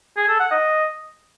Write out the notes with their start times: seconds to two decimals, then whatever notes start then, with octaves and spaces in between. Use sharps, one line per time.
0.17 G#4
0.28 A4
0.40 F#5
0.51 D#5